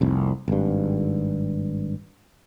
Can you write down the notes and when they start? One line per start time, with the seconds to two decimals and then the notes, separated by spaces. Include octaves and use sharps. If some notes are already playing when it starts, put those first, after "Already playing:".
0.01 F1 C2
0.48 G#1 G2